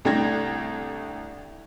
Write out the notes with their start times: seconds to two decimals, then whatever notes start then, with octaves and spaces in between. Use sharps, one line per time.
0.05 C2 A3 D4 G5 G#6 A#6